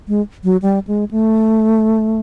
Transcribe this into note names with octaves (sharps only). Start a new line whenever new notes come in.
G#3
F#3
G3
G#3
A3